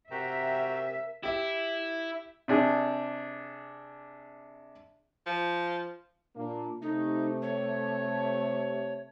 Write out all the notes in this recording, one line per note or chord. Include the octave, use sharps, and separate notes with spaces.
C3 F#4 A#4 E5 G5 A#5
E4 G4 E5
C3 D4 G#4
F3
A#2 A#3 D4
C3 A3 D#4
C#5